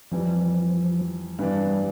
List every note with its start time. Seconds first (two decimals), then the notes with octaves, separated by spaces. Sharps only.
0.11 F2 E3 F3 G3
1.39 G2 E3 G3 B3 D4